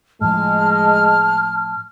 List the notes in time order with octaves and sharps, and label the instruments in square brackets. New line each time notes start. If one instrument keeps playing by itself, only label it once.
[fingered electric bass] A2 F3 [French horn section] G#3 [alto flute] A5 [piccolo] F6